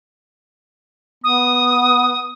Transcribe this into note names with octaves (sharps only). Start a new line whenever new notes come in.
B3 D#6